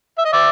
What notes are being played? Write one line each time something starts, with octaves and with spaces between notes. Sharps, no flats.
E5
D#5
D5 E5